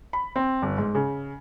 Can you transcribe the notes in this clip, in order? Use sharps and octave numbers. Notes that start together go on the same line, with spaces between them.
B5
C4
G1
G#2
C#3